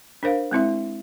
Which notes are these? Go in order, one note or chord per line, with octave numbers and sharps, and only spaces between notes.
D4 A#4 C5 F5
G#3 C4 E4 E5